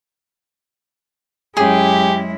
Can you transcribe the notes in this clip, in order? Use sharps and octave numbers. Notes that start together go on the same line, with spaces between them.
F#2 G#3 C#4 E4 G4 G#4 G#5